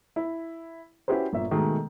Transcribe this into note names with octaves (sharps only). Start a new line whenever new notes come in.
E4
C#4 E4 F#4 G4 B4 C5
G1 A#2 E5
B2 D#3 G#3 A3